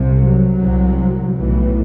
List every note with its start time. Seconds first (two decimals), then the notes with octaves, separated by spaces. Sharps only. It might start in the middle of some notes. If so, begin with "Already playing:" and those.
Already playing: C2 C3
0.21 F#3
0.59 C2 C3
1.36 B1 A2 E3